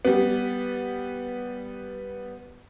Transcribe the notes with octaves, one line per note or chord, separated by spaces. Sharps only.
G3 B3